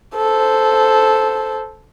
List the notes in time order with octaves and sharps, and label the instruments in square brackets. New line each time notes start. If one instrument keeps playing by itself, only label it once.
[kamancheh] A4 C5